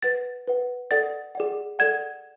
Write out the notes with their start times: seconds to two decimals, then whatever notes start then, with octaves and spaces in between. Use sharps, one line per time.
0.02 B4 F#5 A6
0.48 B4 F#5
0.91 A4 D5 F#5 A6
1.35 G#4 D5 F#5
1.79 A4 D5 F#5 G#6